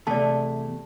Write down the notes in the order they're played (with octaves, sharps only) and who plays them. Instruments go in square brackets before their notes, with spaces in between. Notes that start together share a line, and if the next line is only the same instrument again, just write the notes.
[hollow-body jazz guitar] E2 C3 A3 [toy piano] D5 A5